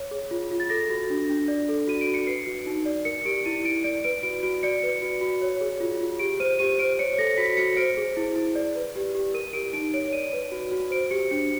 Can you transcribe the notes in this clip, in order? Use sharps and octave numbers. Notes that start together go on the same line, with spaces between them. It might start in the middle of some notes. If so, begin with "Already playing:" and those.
Already playing: C#5
G#4
F4
F4
A6
A4 A#6
F#4
D4
D4
D5
A4
F#4 D#7
D7
F#4
C#7
B4 C7
F#4
D#4
D5
A#4 C#7
G4 D7
E4 D#7
E4 D7
D5 D7
B4 D7
F#4 D7
F#4 D7
D5 C#7
B4
F#4
F#4
C#5
G#4
F4
F4
G4 D7
C5 D#7
G4 D#7
C5 D7
C#5 C#7
A4 A#6
F#4 B6
F#4 C#7
C5 D7
G#4
E4
E4
D5
B4
G4
G4
A#4 D#7
G4 D7
D#4 D7
C#5 D7
D5 D#7
B4
F#4
F#4
C5 D7
G4 C#7
D4 C#7